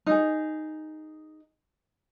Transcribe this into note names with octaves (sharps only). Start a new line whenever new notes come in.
D#4 G#4